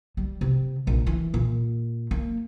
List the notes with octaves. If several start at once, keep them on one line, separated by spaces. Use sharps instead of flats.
G3
C3
A#1
E3
A#2
A#3